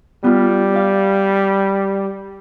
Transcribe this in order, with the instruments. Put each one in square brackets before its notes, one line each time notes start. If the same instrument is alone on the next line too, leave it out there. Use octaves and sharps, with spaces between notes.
[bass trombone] G3 [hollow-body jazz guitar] B3 F4
[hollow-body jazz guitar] D5 F5